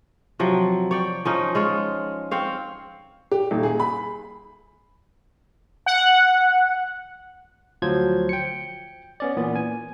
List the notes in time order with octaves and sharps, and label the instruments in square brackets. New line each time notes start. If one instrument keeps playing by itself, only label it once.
[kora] C3 F3 F#3
C#5 D5 G5
F3 C#4 D#4
G#3 F4 C#5
C4 C#5 F5
[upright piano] G4
D#1
G#4
B5
[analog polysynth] F#5
[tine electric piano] D2 F3 F#3 C5 G#6
G5 C#7
B3 C#4 D5
A#2 E3 B3
G#5